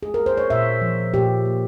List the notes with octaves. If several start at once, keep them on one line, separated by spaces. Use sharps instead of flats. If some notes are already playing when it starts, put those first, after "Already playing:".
G#4
A#4
C5
C#5
A#2 E5
F3
A#2 G4
A#3